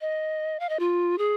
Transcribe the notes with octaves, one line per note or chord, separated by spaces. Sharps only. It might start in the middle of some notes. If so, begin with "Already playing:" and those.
D#5
F5
D#5
F4
G#4